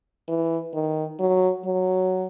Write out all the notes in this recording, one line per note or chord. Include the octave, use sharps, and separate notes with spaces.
E3
D#3
F#3
F#3